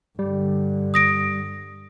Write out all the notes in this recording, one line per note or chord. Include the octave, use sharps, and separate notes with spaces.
G2 D3 G3
D#6 A#6 D7